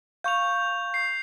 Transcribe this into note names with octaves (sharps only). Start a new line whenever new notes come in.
F5 C#6 G6 F7
C7